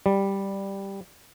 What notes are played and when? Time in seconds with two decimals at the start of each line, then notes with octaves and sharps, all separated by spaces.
0.06 G3